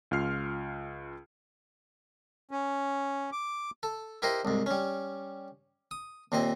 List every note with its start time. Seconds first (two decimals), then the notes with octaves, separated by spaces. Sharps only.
0.11 C#2 F4 F6 C7
2.51 C#4
3.32 D6
3.83 A4
4.22 E4 G4 A#4 C5 D#5
4.45 C2 G#2
4.66 G3 C#4
5.91 D#6
6.32 D#2 A#2 C4 D#5